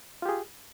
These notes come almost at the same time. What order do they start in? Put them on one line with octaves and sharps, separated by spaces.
F4 G4 G#4